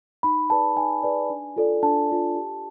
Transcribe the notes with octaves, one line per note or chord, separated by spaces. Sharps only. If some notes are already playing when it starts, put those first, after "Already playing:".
D#4 B5
G#4 B4 D5 A5
D#4 G#5
G#4 B4 D5
D4
F4 A4 D5
D4 A5
F4 A4 D5
G4